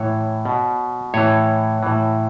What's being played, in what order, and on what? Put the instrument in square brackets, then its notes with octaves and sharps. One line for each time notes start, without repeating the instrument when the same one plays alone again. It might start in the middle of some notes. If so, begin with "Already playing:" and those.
Already playing: [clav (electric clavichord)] A2 E3 C#5
B2
A2 E3 C#5
A2 E3